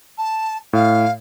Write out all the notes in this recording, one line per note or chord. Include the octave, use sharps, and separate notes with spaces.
A5
A2 F5